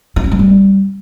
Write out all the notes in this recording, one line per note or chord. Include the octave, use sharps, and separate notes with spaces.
D#4
C#4
G#3
G3